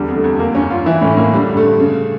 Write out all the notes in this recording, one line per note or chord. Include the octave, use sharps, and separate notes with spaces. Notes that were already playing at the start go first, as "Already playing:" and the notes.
Already playing: E2 D3 G3
F2
A3
F2
D3 A#3
G2 C#4
G2 F4
E3 E4
A2 C#4
A2 A#3
D3 G3
G2
A3
G2
C#3